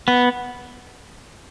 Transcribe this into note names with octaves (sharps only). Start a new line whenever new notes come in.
B3